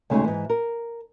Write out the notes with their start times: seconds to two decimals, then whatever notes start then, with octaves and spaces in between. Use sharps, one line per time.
0.10 D2 C#3 G#3 A3 C#4 D#4
0.24 G#2 E3
0.50 A#4